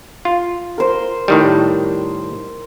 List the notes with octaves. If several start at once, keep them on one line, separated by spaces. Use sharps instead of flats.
F4
A#4 C5
A2 D#3 G3